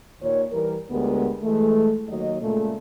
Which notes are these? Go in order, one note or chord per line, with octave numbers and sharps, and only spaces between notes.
D#2 A#2 D#3 C#5
E3 G3 A#4
D2 G#3 B3 G4 A#4
E3 G#3 A3
D#2 F#3 F#4 D#5
A#2 C#3 G#3 A3